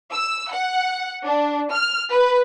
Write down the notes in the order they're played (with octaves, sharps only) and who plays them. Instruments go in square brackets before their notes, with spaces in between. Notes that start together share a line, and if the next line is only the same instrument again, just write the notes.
[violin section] E6
F#5
D4
F6
B4